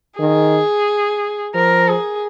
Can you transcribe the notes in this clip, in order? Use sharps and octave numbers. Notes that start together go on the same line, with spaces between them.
D#3 G#4
F3 A#4
G#4